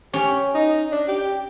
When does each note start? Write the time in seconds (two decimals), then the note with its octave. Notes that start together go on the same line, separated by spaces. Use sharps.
0.13 C#4 G4
0.54 D#4
0.92 D4
1.08 G4